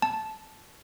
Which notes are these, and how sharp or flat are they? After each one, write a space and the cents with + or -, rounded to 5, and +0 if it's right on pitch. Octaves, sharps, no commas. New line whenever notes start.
A5 -10